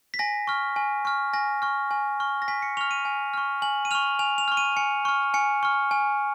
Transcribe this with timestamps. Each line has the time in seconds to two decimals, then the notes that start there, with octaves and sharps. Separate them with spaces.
0.14 B6
0.19 G#5 A#6
0.47 C#6 F6
0.76 G#5
1.05 C#6 F6
1.34 G#5 A#6
1.62 C#6 F6
1.91 G#5
2.20 C#6 F6
2.42 A#6
2.48 G#5 B6
2.62 C#7
2.77 C#6 F6 F7
2.91 D#7
3.05 G#5
3.34 C#6 F6
3.62 G#5 F#7
3.85 D#7
3.91 C#6 F6 F7
4.19 G#5 F7
4.38 F7
4.48 C#6 F6
4.57 D#7
4.77 G#5 C#7
5.05 C#6 F6
5.34 G#5 C#7
5.63 C#6 F6
5.91 G#5